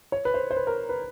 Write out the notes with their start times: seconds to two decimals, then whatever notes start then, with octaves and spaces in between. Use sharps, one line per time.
0.12 C#5
0.25 B4
0.34 C5
0.51 C5
0.57 B4
0.67 A#4
0.89 B4